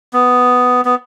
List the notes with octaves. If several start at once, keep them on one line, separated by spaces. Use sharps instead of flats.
B3
B3